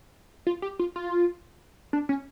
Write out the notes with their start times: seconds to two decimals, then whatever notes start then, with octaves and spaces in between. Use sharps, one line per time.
0.47 F4
0.62 G4
0.79 F4
0.96 F4
1.93 D4
2.09 C#4